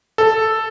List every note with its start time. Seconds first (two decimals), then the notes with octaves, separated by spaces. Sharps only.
0.18 A4